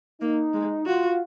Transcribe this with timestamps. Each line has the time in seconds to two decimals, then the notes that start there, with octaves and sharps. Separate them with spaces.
0.21 A#3 D#4
0.54 G#3
0.86 F4 F#4